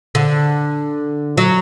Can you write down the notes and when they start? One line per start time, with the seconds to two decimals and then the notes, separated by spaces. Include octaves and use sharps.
0.15 D3
1.37 F#3